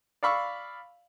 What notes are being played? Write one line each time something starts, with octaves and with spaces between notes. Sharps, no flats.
D5 F5 B5 C#6 E6